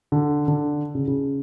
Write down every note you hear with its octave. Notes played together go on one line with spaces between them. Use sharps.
D3
D3
C#3
C#3